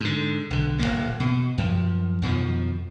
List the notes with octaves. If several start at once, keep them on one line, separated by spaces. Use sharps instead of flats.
G#2 D3
B1 D3
D1 C#2 A#2 A#3
B2
F#2 F3
F2 B2 D#3 F3